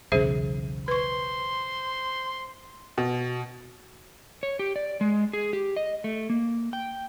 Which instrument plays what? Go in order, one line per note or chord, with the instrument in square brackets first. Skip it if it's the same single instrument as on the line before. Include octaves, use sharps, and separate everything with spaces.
[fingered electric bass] B1 E2 C#3 [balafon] G#4 C5 E5
[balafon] B4 C#6 [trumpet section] C5 C6
[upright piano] B2
[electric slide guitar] C#5
G4
D5
G#3
G#4
G4
D#5
A3
A#3
G5